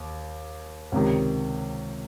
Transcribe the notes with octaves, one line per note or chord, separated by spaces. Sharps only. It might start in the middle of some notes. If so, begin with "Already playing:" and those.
Already playing: D#2
C#2 C3 D#3